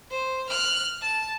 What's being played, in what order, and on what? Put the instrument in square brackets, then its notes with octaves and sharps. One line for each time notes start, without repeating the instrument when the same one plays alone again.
[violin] C5
F6 F#6
A5